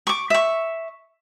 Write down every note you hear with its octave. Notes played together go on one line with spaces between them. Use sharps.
C#6 D6
E5 C#6